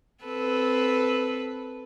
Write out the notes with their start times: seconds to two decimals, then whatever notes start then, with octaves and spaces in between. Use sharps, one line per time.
0.24 C4 A4 B4